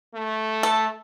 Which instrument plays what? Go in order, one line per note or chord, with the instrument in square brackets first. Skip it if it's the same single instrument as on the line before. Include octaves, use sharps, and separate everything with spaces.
[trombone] A3
[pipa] A4